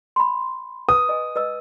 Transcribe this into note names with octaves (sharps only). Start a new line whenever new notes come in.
B5 C6
B4 D#6
D#5 G#5
B4 D#5 E6